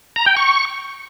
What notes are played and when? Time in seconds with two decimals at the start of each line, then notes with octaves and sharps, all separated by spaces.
0.16 A#5
0.26 G5
0.37 C#6